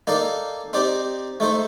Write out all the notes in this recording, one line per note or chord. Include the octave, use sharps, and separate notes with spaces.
A#3 D#4 A4 D5 F5
C4 D#4 G4 D5
A3 D#4 A4 C5